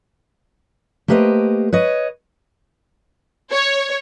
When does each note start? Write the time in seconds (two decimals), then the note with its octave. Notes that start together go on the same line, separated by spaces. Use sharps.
1.08 A3 A#3 G4 B4 C5 D#5
1.73 B4 C#5 D#5
3.51 C#5